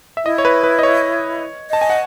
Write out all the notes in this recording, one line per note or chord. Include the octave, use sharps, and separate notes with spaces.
E5
E4 D#5
C#5
B4
B4
D#5
C#5
D#5 A5
G#5
F#5